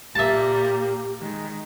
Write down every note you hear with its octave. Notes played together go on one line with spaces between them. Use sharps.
A#2 A#3 G4 E5 A5
D#3 G#3